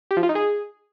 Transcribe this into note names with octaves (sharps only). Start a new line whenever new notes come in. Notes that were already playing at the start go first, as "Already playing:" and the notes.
G4
F3
F4
D#4
G#4